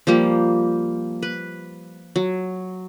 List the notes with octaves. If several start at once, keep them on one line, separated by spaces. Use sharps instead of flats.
F3 G3 A#3
B4
F#3